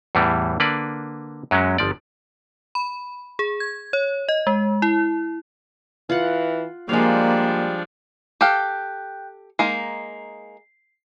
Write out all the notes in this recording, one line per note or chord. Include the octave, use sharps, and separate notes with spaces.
E2 A2 E3 G3
D3 A#3 B4 D5
F#2 F#3 G#3 C#4
G1 F3 D5
B5
G#4
G#6
C#5
D#5
G#3
E4
E3 F4 F#5
F3 G3 G#3 A#3 D4 F5
G4 A4 F5 G5 F#6 G6
G#3 A#3 D#4 C7